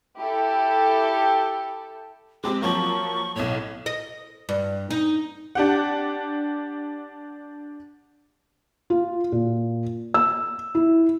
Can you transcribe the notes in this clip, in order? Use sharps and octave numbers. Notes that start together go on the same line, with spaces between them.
E4 G4 A4
G#3 C4 G4 D6
F3 F#3 A#3 C#6
B1 A2 C#5
D#5
G2
D#4
D4 G4 F#5
F4
A#2
E6
E4